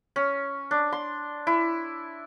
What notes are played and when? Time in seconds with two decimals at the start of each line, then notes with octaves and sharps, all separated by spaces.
0.16 C#4
0.71 D4
0.93 C6
1.47 E4